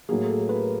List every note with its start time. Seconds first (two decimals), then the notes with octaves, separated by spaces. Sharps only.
0.09 A2 F#3 A#3 G#4
0.25 A4
0.40 A4
0.49 B4
0.56 A#4